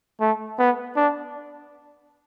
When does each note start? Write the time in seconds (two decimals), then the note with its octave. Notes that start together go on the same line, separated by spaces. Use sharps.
0.21 A3
0.59 B3
0.96 D4